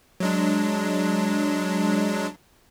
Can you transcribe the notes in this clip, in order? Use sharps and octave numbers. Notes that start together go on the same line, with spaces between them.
F#3 G#3 D4